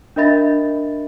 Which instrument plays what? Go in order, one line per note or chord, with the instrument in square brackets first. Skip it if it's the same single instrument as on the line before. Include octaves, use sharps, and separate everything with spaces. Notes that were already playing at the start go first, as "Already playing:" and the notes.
[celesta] D4 A#4 D#5 E5 B5 A6